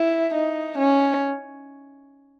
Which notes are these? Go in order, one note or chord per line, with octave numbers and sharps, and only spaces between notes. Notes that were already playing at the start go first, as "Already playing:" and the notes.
Already playing: E4
D#4
C#4